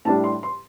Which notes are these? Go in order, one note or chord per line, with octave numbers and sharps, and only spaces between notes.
A2 G3 D4 A5
C6
C6